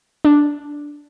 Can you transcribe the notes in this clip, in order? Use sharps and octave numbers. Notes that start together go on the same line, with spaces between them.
D4